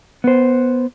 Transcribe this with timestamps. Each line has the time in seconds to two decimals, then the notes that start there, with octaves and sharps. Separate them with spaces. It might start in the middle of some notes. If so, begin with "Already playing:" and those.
0.24 B3 C5